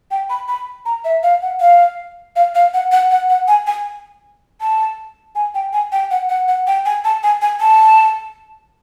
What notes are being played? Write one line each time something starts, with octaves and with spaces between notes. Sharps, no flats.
G5
B5
B5
A#5
E5
F5
F#5
F5
F5
F5
F#5
F#5
F#5
F#5
G#5
G#5
A5
G#5
G5
G#5
G5
F#5
F#5
F#5
G5
G#5
A5
G#5
G#5
A5